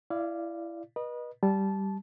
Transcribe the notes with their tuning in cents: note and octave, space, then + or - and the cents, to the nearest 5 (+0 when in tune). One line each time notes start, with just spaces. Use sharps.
E4 +20 D5 +0 F5 -15
B4 -35 D#5 -20
G3 -5 A5 -15